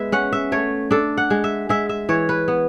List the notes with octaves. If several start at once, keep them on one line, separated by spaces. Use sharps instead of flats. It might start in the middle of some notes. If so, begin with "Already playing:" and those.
Already playing: G#3 B3 B4 E5
C#4 F#5
E5
A3 C#5
D4 A4
F#5
G#3
E5
G#3 E5
E5
E3 C#5
B4
B3